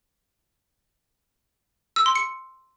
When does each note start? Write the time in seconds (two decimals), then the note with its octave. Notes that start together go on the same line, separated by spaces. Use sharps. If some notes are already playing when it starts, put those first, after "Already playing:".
1.96 E6
2.06 C6
2.15 C#7